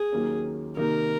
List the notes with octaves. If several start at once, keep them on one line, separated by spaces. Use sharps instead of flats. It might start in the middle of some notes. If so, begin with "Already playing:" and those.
Already playing: G#4
D#2 D#3 F#3 A#3 C#4
C3 D#3 A#3 D#4 A#4